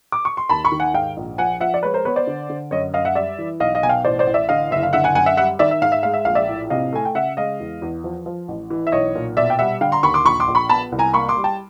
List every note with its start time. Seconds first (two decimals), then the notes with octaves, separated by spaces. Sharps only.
0.12 D6
0.25 C#6
0.37 C6
0.49 D#2 A5 B5
0.64 B5 C#6
0.72 D#3
0.80 F#5 G#5
0.94 G#2 F5 G5
1.17 A#1
1.38 F3 F#5 G#5
1.60 F3 E5 F#5
1.74 D5
1.83 G#3 B4 C#5
1.94 A#4 C5
2.05 B3 B4 C#5
2.16 C5 D5
2.27 D3
2.50 D3
2.71 F#2 C#5 D#5
2.94 F#2 D#5 F5
3.05 E5 F#5
3.15 G3 D5 E5
3.39 E3
3.60 B1 D#5 F5
3.75 D#5 F5
3.83 B2 G#5
3.89 F5 G5
4.05 A1 C5 D5
4.19 C5 D5
4.27 A1
4.34 D5 E5
4.49 D3 D#5 F5
4.71 F#1 E5
4.83 F5
4.93 D3 E5 F#5
5.04 F#5 G#5
5.15 F#2 F#5 G#5
5.26 E5 F#5
5.37 G3 E5 F#5
5.59 D#3 D5 E5
5.71 E5
5.82 G#2 F5
5.92 E5
6.03 G#3 F5
6.14 E5
6.25 A#1 F5
6.35 D5 E5
6.49 A2
6.70 C3 D#5 F5
6.93 A3 G#5
7.05 G5
7.15 C#3 E5 F#5
7.37 G#3 D#5 F5
7.60 E2
7.82 E2
8.04 F3
8.26 F3
8.48 A1
8.70 E3
8.87 E5
8.92 B1 C#5 D#5
9.15 A#2
9.37 B2 D5 E5
9.50 G5
9.59 G3 E5 F#5
9.81 D3 F5 G5
9.92 A#5 C6
10.03 D#2 B5 C#6
10.14 C6 D6
10.25 A#1 B5 C#6
10.40 C6 D6
10.48 A#1
10.55 B5 C#6
10.69 B3 A5 B5
10.92 C2
10.99 G#5 A#5
11.13 A#3 B5 C#6
11.29 C6 D6
11.36 G3
11.44 G5 A5